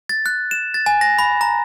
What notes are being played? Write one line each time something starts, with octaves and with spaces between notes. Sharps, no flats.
A6
F#6
E7
A6
G#5
A#6
B5
A#5